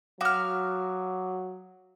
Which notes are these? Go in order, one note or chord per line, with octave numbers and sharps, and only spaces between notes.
F#3 F#4 F5 D6 D#6 F6